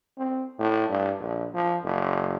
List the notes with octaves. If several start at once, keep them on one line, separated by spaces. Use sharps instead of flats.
C4
A2
G2
A#1
F3
F#1